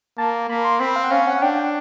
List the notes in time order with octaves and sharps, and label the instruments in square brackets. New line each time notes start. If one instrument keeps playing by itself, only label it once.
[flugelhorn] A#3 [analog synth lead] A5
[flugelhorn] A#3 [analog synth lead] B5
[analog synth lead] C6
[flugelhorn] C4 [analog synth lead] B5
[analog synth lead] F5
F#5
[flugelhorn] C#4 [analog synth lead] F5
[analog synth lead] F#5
[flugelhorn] D4 [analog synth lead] G5
[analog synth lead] G5